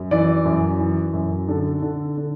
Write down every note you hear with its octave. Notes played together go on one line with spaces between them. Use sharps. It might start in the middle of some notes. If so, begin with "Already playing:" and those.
Already playing: F#2
E3 D5
F#2
E3
F#2
D3 A4
D3
D3